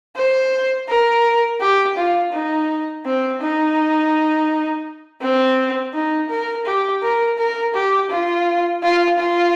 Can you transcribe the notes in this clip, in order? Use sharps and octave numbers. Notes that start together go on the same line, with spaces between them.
C5
A#4
G4
F4
D#4
C4
D#4
C4
D#4
A#4
G4
A#4
A#4
G4
F4
F4
F4